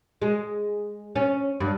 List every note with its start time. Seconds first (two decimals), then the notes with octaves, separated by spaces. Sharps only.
0.22 G#3
1.15 C#4
1.60 G2